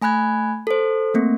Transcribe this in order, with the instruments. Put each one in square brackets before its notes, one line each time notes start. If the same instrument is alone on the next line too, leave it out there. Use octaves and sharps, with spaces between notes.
[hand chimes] A3 G#5 B5 F#6 G#6
A4 C5
A3 A#3 C4